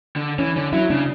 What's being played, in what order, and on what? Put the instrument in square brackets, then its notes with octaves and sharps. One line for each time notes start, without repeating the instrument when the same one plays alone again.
[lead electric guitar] D3
[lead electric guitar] E3 [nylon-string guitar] C#4
[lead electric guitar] D3 [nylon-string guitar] C#4
[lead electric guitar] F#3 [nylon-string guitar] E4
[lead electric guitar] C#3 [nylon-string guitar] D4